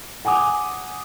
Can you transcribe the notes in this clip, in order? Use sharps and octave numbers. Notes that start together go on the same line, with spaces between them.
F#5 G#5 D6 D#6